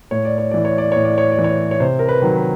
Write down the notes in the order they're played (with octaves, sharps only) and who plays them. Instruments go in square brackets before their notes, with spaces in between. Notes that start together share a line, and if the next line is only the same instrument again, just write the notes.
[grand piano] A2 C#5
D5
C#5
E3 D5
C#5
D5
A2 C#5
D5
C#5
D5
E3
C#5
C#5
C3 C5
A#4
B4
D#3 F#3
B4